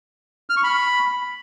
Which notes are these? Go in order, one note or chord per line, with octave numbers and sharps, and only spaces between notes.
F6
C#6
B5